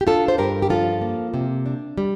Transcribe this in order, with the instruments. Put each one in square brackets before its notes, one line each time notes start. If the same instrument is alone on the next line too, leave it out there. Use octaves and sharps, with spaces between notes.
[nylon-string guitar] G4
D4 F4 A4
C5
G2 G4 A#4
G4
F3 F4 A4
A#3
C3
D4
G3